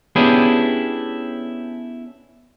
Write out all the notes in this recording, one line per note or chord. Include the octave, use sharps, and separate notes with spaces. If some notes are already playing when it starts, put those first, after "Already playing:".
B3 C#4 D4 E4 G4 G#4